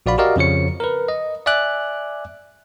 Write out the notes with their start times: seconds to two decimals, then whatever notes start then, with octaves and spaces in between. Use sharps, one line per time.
0.06 A#1 F#4 D5 F5 B5
0.18 F#4 G4 A#4 D5 D#5 F5
0.36 F2 C#3 F3 C#5 C#7
0.80 A#4 B4
1.08 D#5
1.46 D5 E5 G#5 D6 F#6